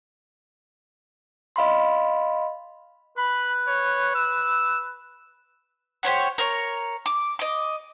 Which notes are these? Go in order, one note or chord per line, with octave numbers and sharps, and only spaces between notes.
D#5 F5 B5 C6
B4 B5
C#5
E6
G4 C5 C#5 F#5
A#4 C#5
D6
D#5 D6